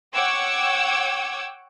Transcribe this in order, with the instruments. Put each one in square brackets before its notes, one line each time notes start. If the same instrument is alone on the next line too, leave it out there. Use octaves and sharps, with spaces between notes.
[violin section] C#5 F#5 G5 D6 E6 G#6